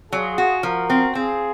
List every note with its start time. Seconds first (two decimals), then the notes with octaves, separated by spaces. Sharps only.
0.12 F#3 F4 G#4
0.38 F#4
0.63 F3 F#4 A#4
0.90 C4
1.15 C4 F4 G#4